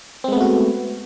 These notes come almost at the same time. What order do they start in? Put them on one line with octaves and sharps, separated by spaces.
C4 G#3 B3 A3 F#4